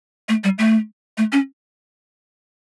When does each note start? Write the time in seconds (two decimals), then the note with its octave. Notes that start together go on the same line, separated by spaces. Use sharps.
0.29 A3
0.44 G3
0.58 A3
1.18 A3
1.32 C#4